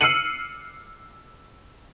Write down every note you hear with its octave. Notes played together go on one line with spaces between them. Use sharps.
E6 F6 C7 C#7 D#7 F#7